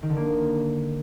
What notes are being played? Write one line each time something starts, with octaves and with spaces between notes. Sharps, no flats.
D#3
D3
A#3